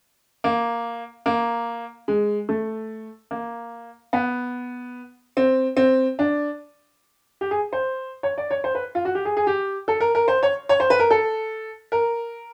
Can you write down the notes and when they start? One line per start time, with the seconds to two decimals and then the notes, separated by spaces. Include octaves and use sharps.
0.44 A#3
1.26 A#3
2.08 G#3
2.49 A3
3.31 A#3
4.13 B3
5.37 C4
5.77 C4
6.19 D4
7.41 G4
7.51 G#4
7.73 C5
8.23 C#5
8.38 D5
8.51 C#5
8.64 C5
8.75 B4
8.95 F4
9.05 F#4
9.15 G4
9.25 G#4
9.37 G#4
9.47 G4
9.88 A4
10.00 A#4
10.15 A#4
10.28 C5
10.43 C#5
10.69 C#5
10.80 C5
10.90 B4
11.00 A#4
11.10 A4
11.92 A#4